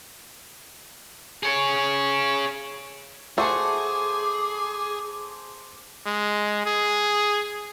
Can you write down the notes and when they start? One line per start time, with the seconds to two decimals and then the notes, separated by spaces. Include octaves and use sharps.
1.43 G#4 C#5
3.38 A3 F#4 G#4 C5 G#5 A5 D6
6.06 G#3
6.66 G#4